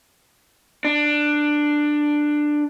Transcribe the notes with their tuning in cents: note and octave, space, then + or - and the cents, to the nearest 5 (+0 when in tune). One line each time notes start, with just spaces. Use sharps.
D4 +10